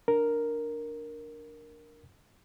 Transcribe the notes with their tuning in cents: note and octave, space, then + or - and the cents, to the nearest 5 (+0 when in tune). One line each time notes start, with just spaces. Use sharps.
D4 +0 A#4 +0